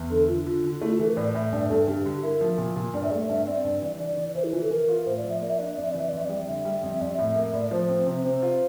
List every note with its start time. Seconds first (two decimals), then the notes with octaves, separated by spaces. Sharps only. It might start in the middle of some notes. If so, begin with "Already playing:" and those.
Already playing: E2
0.10 D3 A4
0.28 D3 F4
0.46 D3 F4
0.64 D3
0.81 A3 E4
0.90 F4
0.99 E3 A4
1.07 A#4
1.17 A2 D5
1.35 A2 E5
1.52 G2 D5
1.69 G2 A4
1.88 G2 G4
2.05 D3 G4
2.23 E4 A#4
2.41 F3
2.58 A#2
2.76 A#2
2.93 G2 D5
3.03 E5
3.11 A3 D5
3.29 G2 E5
3.47 C4 D5
3.64 G2
3.82 E3
3.99 E3 D5
4.17 E3
4.35 E3 C5
4.44 E4
4.53 E3 F4
4.62 A4
4.71 E3 A#4
4.88 F4
5.06 A2 C5
5.17 D5
5.24 F3
5.29 E5
5.41 A#3 D5
5.50 E5
5.59 D4 D5
5.66 E5
5.74 F2 D5
5.84 E5
5.92 E3 D5
6.00 E5
6.09 F2 D5
6.18 E5
6.25 G3 D5
6.47 D3 E5
6.65 G3
6.83 F2
6.92 E5
7.01 F2 D5
7.11 E5
7.18 A2
7.36 A#3
7.53 A2 D5
7.71 F3 C5
7.89 C4
8.06 C3
8.24 C3 C5
8.42 F4